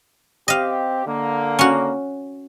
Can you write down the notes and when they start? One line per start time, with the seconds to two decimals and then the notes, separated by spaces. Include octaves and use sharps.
0.48 C4 G4 D#5 F5
1.07 D3 A#3
1.59 C#4 F#4